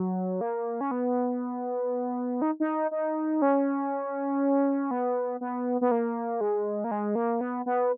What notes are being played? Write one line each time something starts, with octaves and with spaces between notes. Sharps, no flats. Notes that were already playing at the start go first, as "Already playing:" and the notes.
Already playing: F#3
A#3
C#4
B3
D#4
D#4
D#4
C#4
B3
B3
B3
A#3
G#3
A#3
G#3
A#3
B3
B3